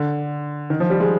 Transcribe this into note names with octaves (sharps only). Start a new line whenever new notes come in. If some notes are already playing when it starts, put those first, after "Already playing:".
Already playing: D3
D#3
F3
G3
G#3